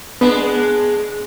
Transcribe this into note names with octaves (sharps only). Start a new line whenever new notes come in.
G#3 B3 D4